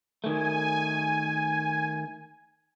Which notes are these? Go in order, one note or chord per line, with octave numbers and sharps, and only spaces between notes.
D#3 A3 G#5